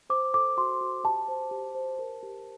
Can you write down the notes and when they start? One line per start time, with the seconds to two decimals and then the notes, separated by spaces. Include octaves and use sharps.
0.10 C5 D6
0.34 A4 D6
0.57 F#4 C6
0.81 F#4
1.04 G4 A5
1.28 C5
1.51 G4
1.75 C5
1.99 A#4
2.23 G4